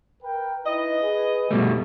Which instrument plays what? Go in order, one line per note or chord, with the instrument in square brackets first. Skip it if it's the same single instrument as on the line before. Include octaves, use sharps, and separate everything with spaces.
[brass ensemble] A#4 B4 G5
[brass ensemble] D#4 E4 B4 [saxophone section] D#5
[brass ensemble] G#4 B4
[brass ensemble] F2 [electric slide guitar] B2 G3 A3